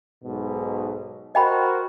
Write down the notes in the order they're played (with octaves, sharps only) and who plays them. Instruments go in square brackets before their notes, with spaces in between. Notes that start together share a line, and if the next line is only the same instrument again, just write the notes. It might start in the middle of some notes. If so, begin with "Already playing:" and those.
[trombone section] B1 G#2 B2
[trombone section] F#4 A#4 C5 [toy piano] D#5 G5 B5